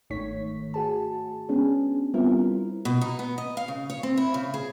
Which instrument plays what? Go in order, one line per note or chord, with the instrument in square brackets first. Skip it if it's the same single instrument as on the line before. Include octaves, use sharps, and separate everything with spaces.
[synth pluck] G1 G#2 D#3 A3 C#5 B6
F#4 G#4 A5
G#3 B3 C#4 D4 G#4
G3 B3 C4 E4 F4 A#4
[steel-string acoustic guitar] B2
D#4
B3
D#5
F5
C#3
C#5
C4
E4
C#3
G#4